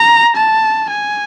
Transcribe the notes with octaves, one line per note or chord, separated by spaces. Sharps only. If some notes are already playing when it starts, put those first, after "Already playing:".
Already playing: A#5
A5
G#5